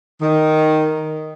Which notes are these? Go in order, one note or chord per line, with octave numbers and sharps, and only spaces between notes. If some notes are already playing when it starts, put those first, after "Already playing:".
D#3